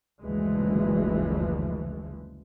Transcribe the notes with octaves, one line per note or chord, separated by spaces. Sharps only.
F#1 D2 E3 F3 G#3